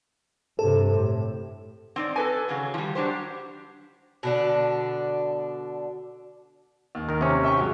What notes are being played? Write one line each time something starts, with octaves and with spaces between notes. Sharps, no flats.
G2 C3 A4
A2
C4 D#4 D5
A4 B4 G#5
C#3 F#3 G#4
F3 G3
F#3 D4 G4 C5
B2 D3 D4
D#2
D#3 A#4
C3 C#4
E5 G5 C#6
F#3 G#3 F#4